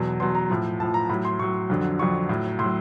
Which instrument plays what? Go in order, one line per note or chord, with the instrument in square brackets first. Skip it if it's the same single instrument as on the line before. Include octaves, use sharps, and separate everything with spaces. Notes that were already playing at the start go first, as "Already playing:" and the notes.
Already playing: [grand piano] E2 B2 F#3
E2 B2 F#3 C6
A#5
A2 F3
A2 F3 A5
A#5
A2 B5
F#3
C6
A2 F#3 C#6
F2 D3 F#3
F2 D3 F#3 C#6
A2 F#3
A2 C6
F#3